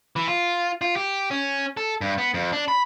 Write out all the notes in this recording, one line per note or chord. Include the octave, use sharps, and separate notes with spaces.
E3
F4
F4
G4
C#4
A4
G2
B3
F2
D4
B5